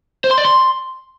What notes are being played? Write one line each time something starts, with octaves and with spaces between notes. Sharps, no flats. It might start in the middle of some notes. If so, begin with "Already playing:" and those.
C5
C6
D5
C6